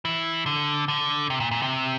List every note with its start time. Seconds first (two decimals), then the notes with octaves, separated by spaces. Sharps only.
0.05 E3
0.46 D3
0.88 D3
1.30 C3
1.40 A#2
1.51 A#2
1.62 C3